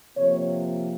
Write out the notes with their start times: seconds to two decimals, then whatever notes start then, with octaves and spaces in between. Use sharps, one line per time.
0.17 C3 F3 A#3 C#5